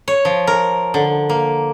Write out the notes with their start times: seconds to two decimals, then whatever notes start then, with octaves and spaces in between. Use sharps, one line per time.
0.08 C#5
0.25 F3
0.47 A#4
0.94 D3
1.30 A#3